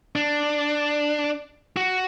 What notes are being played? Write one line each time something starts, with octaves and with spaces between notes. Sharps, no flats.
D4
F#4